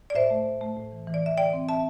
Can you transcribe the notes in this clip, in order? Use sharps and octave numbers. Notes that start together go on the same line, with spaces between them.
D5
A2 C5 E5
A3
A2
A3
A2
E3
E3
D5
E3 E5
D3 D5 G5
C4
E5 A5